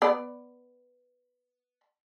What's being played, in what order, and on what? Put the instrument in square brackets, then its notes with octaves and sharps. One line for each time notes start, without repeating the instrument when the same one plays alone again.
[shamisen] B3 D5